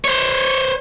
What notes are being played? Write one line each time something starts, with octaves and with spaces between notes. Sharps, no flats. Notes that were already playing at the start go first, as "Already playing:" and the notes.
C5 C#5